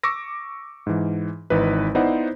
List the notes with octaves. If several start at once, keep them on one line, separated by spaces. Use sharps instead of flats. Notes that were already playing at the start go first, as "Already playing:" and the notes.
C#6 D6 E6 A#6
G#2 E3
G#1 E3 D#4 B4
B3 D#4 E4 C5 D5 F#5